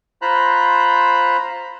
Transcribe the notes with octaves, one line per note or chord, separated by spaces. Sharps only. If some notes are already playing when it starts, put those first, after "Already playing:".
F4 C5 A#5 B5 F#6